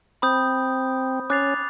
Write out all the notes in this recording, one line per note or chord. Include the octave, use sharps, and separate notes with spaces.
C4 B5 D#6 G6
C#4 D6 F#6 A6 C7 F7